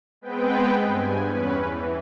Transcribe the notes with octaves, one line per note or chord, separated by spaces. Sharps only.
G#3 B3 C4 B4 G5
G2 G#5
E2 C#4 B4
E3